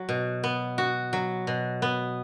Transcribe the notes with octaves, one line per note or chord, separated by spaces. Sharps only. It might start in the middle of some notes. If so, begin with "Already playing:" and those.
Already playing: F#3 F#4
B2
B3
F#4
F#3
B2
B3